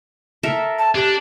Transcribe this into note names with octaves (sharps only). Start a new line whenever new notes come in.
A4 A#4 E5
A5
D4 G4